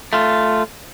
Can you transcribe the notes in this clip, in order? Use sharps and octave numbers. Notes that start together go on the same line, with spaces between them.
A3 F4